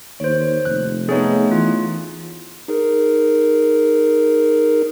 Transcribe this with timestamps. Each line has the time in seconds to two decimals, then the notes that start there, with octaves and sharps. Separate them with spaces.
0.20 D#2 C5 C#5
0.65 F1 F#6
1.09 A3 B3 D#4 G#4 C#5
1.51 E3 F4
2.68 D#4 G#4 A#4